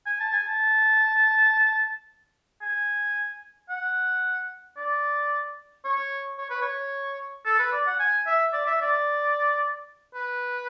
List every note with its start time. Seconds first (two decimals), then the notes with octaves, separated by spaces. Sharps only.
0.06 G#5
0.20 A5
0.33 G#5
0.47 A5
2.62 G#5
3.70 F#5
4.77 D5
5.85 C#5
6.38 C#5
6.50 B4
6.62 C#5
7.46 A4
7.59 B4
7.72 D5
7.86 F#5
7.99 G#5
8.27 E5
8.53 D5
8.67 E5
8.81 D5
10.15 B4